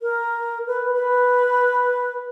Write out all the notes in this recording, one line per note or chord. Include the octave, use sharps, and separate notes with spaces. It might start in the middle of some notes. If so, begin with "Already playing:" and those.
A#4
B4
B4